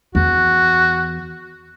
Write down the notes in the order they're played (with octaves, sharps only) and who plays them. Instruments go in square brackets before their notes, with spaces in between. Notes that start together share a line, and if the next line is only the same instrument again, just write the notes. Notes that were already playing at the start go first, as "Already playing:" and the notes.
[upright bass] E2 [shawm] F#4